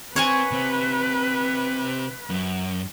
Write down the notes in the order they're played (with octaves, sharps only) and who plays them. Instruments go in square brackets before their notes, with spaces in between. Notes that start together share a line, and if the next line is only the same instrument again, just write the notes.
[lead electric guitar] C4 [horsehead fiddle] B4 [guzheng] C#5 F#5 G#5
[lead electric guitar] C3 C4
F#2